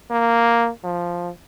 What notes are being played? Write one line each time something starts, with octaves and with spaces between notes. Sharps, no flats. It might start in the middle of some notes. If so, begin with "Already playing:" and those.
A#3
F3